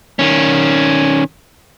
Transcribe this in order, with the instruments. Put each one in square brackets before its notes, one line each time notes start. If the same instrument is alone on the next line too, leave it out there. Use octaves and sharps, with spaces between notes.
[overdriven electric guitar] D#3 C#4